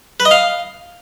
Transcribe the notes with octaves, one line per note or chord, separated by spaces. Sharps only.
B4
D#5
F5